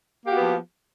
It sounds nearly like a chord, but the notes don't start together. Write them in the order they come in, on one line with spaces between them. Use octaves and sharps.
A#3 G4 F#4 B3 F3